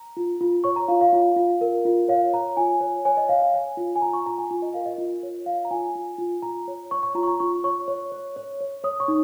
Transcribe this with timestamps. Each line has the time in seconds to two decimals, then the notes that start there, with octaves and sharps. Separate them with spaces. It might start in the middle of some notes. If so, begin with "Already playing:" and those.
Already playing: A#5
0.17 F4
0.41 F4
0.64 C#5 C#6
0.76 A#5
0.88 F4 F5
1.01 F5
1.13 F4
1.36 F4
1.61 A#4
1.85 F4
2.08 C#5 F5
2.33 C#5 A#5
2.57 F4 G#5
2.81 C#5
3.05 C#5 G#5
3.17 D#5
3.29 C#5 F5
3.42 F5
3.54 C#5 G#5
3.77 F4
3.96 G#5
4.02 F4 A#5
4.13 C#6
4.26 F4 A#5
4.38 G#5
4.51 F4
4.62 D#5
4.74 A#4 F5
4.86 D#5
4.98 F4
5.23 C#5
5.46 F4 F5
5.65 A#5
5.71 F4 G#5
5.95 F4
6.18 F4
6.42 F4 A#5
6.68 C#5
6.91 C#5 C#6
7.03 C#6
7.15 F4 A#5
7.23 C#6
7.28 A#5
7.40 F4 C#6
7.64 C#5 C#6
7.88 C#5
8.12 C#5
8.36 C#5
8.61 C#5
8.84 C#5 D#6
9.00 C#6
9.08 D#4